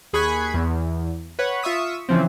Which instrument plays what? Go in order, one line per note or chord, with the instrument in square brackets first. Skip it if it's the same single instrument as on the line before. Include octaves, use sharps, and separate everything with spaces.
[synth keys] D#2 G#4 B5 C#6 F#6 G#6
E2
B4 C#5 F#5
F4 E5 C#6 D#6 B6
C#3 E3 F3 C4